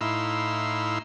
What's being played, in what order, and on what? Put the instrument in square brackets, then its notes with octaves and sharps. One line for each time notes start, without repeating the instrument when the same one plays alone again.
[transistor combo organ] A2 D#4 E4 F5 C6 E6